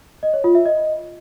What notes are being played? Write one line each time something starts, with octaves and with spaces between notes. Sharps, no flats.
D#5
C#5
F4
E5
D#5